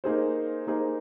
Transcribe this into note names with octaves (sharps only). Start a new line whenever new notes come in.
A#3 D#4 G#4 C5
A#3 D#4 G#4 C5